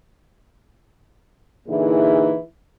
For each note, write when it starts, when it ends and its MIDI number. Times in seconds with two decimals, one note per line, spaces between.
1.68 2.37 46
1.68 2.37 50
1.68 2.37 52
1.68 2.37 63
1.68 2.37 64
1.68 2.37 68